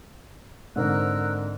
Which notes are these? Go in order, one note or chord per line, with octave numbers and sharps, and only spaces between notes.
G#2 D3 C4 A#4 E6 F#6